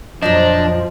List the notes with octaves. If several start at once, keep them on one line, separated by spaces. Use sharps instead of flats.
F2 A#2 F3 F#3 D4 D#5 G6